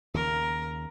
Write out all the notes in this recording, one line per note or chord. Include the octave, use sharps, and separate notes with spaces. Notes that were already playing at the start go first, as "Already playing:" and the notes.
D#2 C#3 A#4